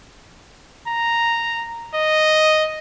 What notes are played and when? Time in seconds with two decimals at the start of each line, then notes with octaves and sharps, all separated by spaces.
0.87 A#5
1.94 D#5